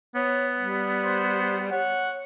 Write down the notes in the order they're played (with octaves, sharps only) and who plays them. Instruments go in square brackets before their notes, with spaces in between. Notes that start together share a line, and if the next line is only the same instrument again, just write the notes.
[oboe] B3 [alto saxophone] C#5
[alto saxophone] G3
[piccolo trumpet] C5
[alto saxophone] C#5 [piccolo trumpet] F#5